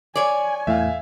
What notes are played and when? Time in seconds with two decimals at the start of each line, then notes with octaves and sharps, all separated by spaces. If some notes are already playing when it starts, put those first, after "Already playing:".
0.16 C#5 D5 G#5
0.67 E2 A2 E5 F5